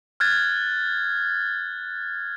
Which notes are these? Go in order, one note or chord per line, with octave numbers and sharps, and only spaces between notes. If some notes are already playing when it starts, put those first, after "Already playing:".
F6 F#6 G#6 A6